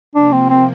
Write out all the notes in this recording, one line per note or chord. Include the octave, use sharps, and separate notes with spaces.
C3 F3 A#3 D4
C4
C4